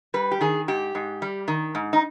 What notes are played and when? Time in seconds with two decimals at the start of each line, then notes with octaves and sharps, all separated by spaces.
0.14 G3 B4
0.31 G4
0.41 D#3 G#4
0.68 G#2 G4
0.95 G#2
1.22 G3
1.48 D#3
1.75 G#2
1.93 D#4